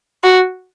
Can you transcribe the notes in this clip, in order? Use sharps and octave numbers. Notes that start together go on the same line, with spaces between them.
F#4